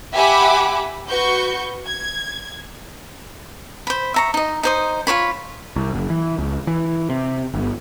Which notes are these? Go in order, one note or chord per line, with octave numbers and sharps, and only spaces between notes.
G4 E5 F#5 G#5 B5 D6
F#4 B4 C#6 G6
G#6
C5 B5
E5 A#5 C#6
D#4 D#5
D#4 C5 D#6
F4 C5 C#5 B5
C2
F#1
E3
C#2
E3
C3
G1